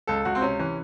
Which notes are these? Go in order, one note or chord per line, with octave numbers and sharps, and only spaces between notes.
C#2 A4
C#2 F#4
C4
C3 C#4
E3 C#4